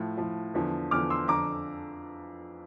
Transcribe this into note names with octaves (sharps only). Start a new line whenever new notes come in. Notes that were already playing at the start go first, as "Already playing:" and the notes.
Already playing: A2 F3
A2 F3
E2 D3 F3
E2 D3 F3 D6 F6
C6 E6
F2 D3 F3 A#5 D6